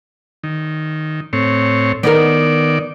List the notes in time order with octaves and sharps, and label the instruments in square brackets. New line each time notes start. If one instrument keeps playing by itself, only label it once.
[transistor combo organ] D#3
A2 C4 C#5
[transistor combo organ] D#3 D5 [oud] B3 D#4 A#4